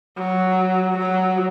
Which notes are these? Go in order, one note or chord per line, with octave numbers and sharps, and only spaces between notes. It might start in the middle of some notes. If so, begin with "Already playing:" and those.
F#3
F#3